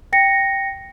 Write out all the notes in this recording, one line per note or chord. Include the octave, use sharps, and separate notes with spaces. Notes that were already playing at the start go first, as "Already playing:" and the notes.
G5 A#6 C#7